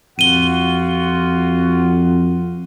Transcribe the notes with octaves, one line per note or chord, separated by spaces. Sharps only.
F2 F4 F#4 F#5 D#7 G7